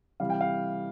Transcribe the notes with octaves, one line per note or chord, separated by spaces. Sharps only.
C3 E3 G3 F5
G5
F5